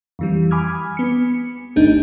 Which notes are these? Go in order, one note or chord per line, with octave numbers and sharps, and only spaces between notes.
F2 E3 G3
G#5 B5 D6 D#6 F6 G#6
B3 C#7
G1 D2 A3 D4 D#4 G6